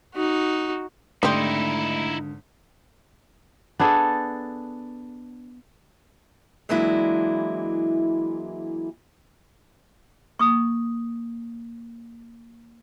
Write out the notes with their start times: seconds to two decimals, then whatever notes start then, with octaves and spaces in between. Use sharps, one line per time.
0.15 D#4 F#4
1.23 G#1 D3 G3 A3 C4 D#4 E4 D#6
3.79 B3 D4 G#4 A4
6.69 E3 F#3 G#3 A#3 D4 E4
10.39 A#3 C#6 D#6